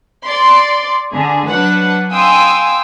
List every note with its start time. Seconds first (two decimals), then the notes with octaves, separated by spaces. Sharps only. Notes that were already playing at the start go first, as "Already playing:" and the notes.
0.25 D5 C6
1.10 D3 G#4
1.48 F#3 D4 B4 F#5
2.11 F5 G5 G#5 C6 D#6 E6